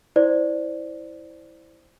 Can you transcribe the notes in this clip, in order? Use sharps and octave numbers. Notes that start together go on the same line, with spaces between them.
E4 C5 D5